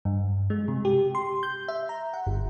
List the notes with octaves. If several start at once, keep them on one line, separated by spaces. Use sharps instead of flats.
G2
G#3
C3
G4
C6
G6
E5
A#5
F#5
G1